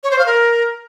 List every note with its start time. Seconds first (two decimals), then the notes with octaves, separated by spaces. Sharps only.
0.04 C#5
0.11 C5
0.19 F5
0.26 A#4